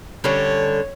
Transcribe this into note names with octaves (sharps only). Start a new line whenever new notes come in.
D3 G3 C#4 C#5